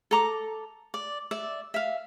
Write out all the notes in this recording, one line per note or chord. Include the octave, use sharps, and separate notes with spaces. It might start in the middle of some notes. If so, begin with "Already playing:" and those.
A4 A#5 D6
D5
D5 E5
E5 F5